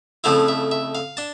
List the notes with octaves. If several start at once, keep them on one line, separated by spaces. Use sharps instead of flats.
F2 C#3 F3 A3 E4 F5
E5
E5
F5
D4 A5